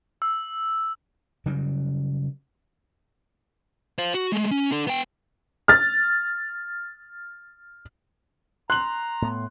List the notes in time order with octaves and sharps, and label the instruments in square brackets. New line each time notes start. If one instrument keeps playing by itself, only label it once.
[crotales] E6
[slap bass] C#3 F#3 G3
[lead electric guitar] C5 F5
F#4
G#3 A3
C#4
D4 A4
B3 G5
[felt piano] F6 A6
[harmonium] A#5 [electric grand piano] C6 [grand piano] F#6 F#7
[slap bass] A2 B3